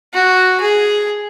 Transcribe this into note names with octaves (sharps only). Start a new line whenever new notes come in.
F#4
G#4